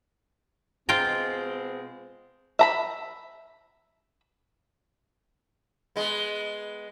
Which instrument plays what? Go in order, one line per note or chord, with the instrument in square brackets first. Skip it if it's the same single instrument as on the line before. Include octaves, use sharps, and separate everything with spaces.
[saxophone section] B2 G#3 C4 [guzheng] F4 G5 A#5
[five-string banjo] E5 A#5 B5
[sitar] G#3 B3